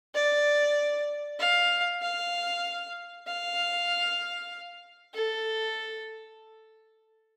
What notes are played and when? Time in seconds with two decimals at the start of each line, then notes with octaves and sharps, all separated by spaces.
0.15 D5
1.39 F5
2.01 F5
3.27 F5
5.14 A4